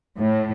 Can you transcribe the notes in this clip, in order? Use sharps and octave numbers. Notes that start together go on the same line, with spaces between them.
A2